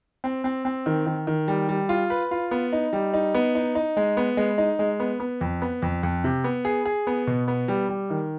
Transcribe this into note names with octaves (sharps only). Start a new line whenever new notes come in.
C4
C4
C4
D#3
D#3
D#3
G3
G3
F4
B4
F4
B3
D#4
G3
D#4
B3
D#4
D#4
G#3
B3
G#3
D#4
G#3
B3
B3
F2
B3
F2
F2
C3
B3
G#4
G#4
B3
B2
B3
G3
G3
D#3